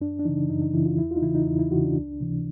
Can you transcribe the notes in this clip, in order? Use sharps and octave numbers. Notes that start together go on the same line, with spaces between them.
F#2 D4
D4
C#3 E3 D#4
F#2 D#4
D#4
C#3 E3 E4
F4
E2 E4
F4
D#4
C#3 E3 E4
D#4
E2 E4
E4
C#3 E3 F#4
D4
C#2
C3 E3